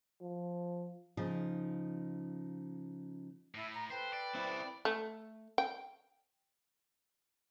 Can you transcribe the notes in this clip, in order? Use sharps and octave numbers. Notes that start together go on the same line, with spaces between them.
F3
C#3 F3 D#4
A2 E4
A#5
A4 B4 C5 G5
D5
C4 E4
A3
G5